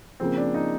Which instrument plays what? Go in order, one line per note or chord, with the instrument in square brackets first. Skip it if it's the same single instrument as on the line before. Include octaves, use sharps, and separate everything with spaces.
[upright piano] C#3 F3 A#3 [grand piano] C4
[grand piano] D4
D#4